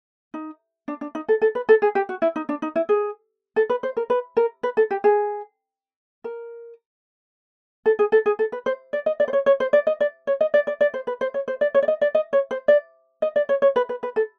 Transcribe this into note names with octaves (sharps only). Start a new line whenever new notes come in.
D#4
D4
D4
D#4
A4
A4
B4
A4
G#4
G4
F#4
E4
D#4
D4
D#4
E4
G#4
A4
B4
C5
A#4
B4
A#4
B4
A4
G4
G#4
A#4
A4
G#4
A4
G#4
A4
B4
C5
D5
D#5
D5
C5
C#5
C#5
C5
D5
D#5
D5
C#5
D#5
D5
D5
D5
C5
B4
C5
C#5
C5
D5
C#5
D5
D#5
D5
D#5
C#5
C5
D5
D#5
D5
C#5
C#5
B4
B4
B4
A4